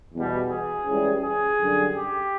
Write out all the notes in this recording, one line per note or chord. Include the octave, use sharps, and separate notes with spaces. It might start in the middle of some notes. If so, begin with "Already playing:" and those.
E2 B2 G3
G#4
C#2 C#3 E3 G3
G#4
F#2 D3 G3
G4